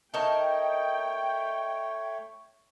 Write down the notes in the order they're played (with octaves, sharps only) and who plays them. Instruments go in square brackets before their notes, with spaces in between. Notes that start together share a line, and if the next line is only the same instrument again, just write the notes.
[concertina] A3 C#5 [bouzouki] D#4 A#4 A5 [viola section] G5